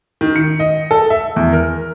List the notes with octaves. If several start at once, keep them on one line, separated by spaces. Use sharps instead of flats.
D#3
C#7
D#5
A4
E5
E2
A#4